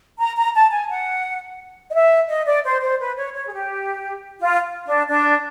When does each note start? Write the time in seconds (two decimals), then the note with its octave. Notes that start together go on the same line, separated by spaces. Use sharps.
0.19 A#5
0.37 A#5
0.55 A5
0.72 G#5
0.89 F#5
1.90 D#5
1.94 E5
2.29 D#5
2.46 D5
2.65 C5
2.82 C5
3.00 B4
3.17 C#5
3.34 C#5
3.48 G#4
3.52 G4
4.40 F4
4.86 D4
5.09 D4